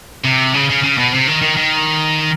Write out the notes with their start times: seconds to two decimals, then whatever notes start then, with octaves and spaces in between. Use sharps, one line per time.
0.25 C3
0.54 C#3
0.70 C#3
0.84 C#3
0.98 B2
1.13 C3
1.27 D#3
1.42 D#3
1.57 D#3